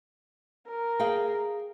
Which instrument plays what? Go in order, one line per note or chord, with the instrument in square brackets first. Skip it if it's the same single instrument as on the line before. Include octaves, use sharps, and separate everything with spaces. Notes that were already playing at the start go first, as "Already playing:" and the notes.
[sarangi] A#4
[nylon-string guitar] G#4 F5 G5